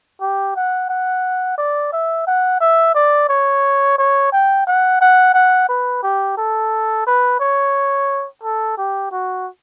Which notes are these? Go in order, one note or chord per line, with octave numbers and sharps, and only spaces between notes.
G4
F#5
F#5
D5
E5
F#5
E5
D5
C#5
C#5
G5
F#5
F#5
F#5
B4
G4
A4
B4
C#5
A4
G4
F#4